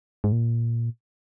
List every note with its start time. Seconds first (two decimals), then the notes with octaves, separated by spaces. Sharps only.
0.24 G#2
0.32 A#2